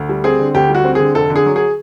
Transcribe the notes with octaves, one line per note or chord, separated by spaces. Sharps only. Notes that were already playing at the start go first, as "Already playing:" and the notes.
Already playing: D2
G3
C4 G#4
D3
D2 G4
G3
F#4
C4
D3 G#4
F1 A4
D3
G#4
F#3
G#4